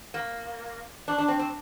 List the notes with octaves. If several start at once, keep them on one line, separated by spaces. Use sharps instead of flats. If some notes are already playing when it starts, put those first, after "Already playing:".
A#3
D4
D4
C4
C4